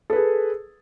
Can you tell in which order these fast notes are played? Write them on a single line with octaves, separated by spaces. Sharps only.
A4 B4 G#4